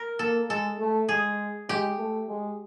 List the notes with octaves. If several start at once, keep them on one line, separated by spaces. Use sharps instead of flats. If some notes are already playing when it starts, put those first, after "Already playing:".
Already playing: A#4
A#3 A4
G#3 A4
A3
G#3 G#4
G#3 G4
A3
G#3